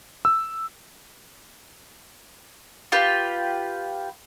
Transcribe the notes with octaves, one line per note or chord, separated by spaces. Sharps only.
E6
F4 G4 B4